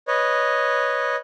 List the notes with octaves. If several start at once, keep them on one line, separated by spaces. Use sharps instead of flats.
B4 C#5 D#5